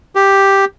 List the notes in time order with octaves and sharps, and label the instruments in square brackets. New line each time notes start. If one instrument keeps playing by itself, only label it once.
[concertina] G4